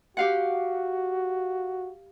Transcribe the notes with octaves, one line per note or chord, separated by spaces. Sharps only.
F#4 G4 F5 F#5